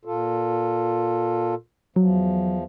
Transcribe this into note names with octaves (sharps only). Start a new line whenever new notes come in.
A#2 F4 A4
E2 F3 F#3